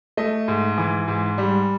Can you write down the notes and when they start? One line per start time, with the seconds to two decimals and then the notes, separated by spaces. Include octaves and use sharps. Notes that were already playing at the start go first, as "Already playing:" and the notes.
0.17 A3 D#5
0.48 G#2
0.78 E3
1.08 G#2
1.38 G3